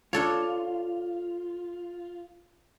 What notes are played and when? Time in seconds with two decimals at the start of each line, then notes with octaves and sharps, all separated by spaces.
0.13 D4 F4 A4 C#5